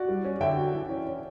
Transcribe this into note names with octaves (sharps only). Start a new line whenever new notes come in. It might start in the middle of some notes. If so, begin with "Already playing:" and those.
Already playing: F#4 D5
G3
C#4
D3 E5 G5
F#4
E3
C#4
C#4